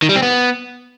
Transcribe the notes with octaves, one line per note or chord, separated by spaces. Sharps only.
D#3
G3
C4
B3